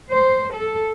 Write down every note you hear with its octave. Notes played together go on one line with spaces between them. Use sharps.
C5
A4